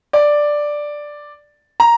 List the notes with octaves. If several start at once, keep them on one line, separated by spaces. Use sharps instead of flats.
D5
A#5